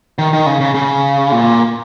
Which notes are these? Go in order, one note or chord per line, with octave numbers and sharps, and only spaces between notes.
D#3
D#3
C#3
C#3
C#3
A#2